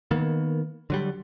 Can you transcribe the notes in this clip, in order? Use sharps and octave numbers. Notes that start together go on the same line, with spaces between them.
D#3 A#3 B3
D3 F#3 G3